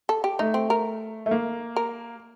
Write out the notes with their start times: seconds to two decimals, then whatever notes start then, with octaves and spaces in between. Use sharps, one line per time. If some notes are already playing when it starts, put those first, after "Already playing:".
0.09 A4
0.24 G4
0.39 A3 D#4
0.54 C4
0.70 A#4
1.26 A3
1.31 A#3
1.76 A#4